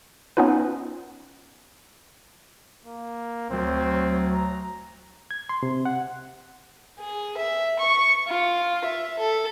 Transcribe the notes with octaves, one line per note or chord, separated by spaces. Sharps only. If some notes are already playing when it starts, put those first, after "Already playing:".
B3 C#4 D#4 F4 B4
A#3
D2 F#3 C4
A#5
G#6
C6
C3
F#5
G#4
E5
C#6
F4
E5
A4